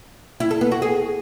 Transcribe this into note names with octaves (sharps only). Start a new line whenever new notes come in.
E4
A4
B3
F#4
G#4